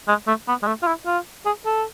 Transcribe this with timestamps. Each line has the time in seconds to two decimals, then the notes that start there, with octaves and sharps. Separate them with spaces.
0.08 G#3
0.27 A3
0.48 B3
0.63 G#3
0.67 A3
0.82 F4
0.87 E4
1.06 F4
1.46 G#4
1.66 A4